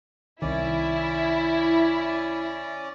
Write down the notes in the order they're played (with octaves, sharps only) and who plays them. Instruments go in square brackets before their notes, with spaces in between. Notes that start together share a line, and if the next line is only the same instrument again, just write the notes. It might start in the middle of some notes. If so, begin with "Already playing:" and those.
[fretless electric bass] C2 D#3 [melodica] C#4 D5 [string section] E4